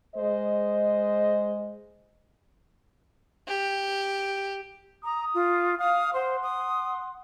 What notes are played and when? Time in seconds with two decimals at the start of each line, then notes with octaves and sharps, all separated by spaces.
0.16 G#3 C5 D#5
3.47 G4
5.04 A#5 D#6
5.35 F4
5.80 F5 D#6
6.14 C5 F#5 C6
6.43 D#6